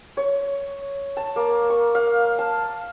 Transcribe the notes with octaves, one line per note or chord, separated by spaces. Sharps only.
C#5
A5
A#3
C#6
F5
A5